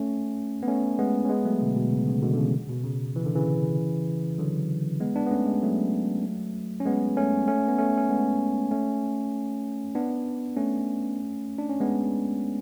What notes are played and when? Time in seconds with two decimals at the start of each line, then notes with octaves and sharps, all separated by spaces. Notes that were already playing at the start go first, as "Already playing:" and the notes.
Already playing: A3 C#4
0.63 B3
0.67 A3 C#4
0.99 G#3 B3
1.25 C#4
1.29 G#3 B3
1.45 F#3 A3
1.61 B2 D3
1.76 B2
1.91 C#3
2.07 C#3
2.22 B2 D3
2.34 D3
2.38 C#3 E3
2.69 B2
2.84 C#3
3.16 E3
3.26 D3
3.35 C#3 E3
4.38 D3 F#3
5.00 G#3 B3
5.16 B3 D4
5.27 B3
5.31 A3 C#4
5.46 G#3 B3
5.62 F#3 A3
6.80 C#4
6.85 G#3 B3
7.17 A3 C#4
7.48 A3 C#4
7.68 B3
7.78 A3 C#4
7.97 C#4
8.09 G#3 B3
8.71 A3 C#4
9.95 B3 D4
10.57 A3 C#4
11.58 D4
11.69 C#4
11.80 G#3 B3